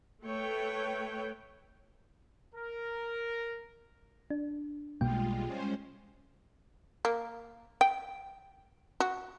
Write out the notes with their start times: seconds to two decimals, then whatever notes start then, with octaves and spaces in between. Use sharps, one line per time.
0.24 A3 A4 B4 C#5 G5
2.55 A#4
4.30 D4
5.01 B1 B2 G3 G#3 A#3 F4 G5
5.45 G#3 C#4 C5
7.05 A#3
7.81 G5
9.00 F#4